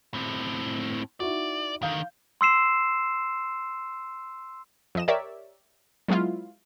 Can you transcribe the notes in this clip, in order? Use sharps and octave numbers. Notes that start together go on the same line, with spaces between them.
A2 C4
D#4 E4 F#4 D5
D3 D#3 F5 G6
C6 E6 C7 E7
F2 D#5 E7
G4 A#4 C#5 D5 E5
F#3 G#3 B3 E4 F4